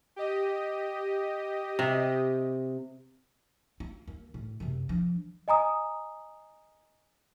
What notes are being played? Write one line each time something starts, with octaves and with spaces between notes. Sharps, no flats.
G4 D#5
C3
F4
D#2
A2
F#2 C3
F3 D4
D#5 G#5 A#5 D#6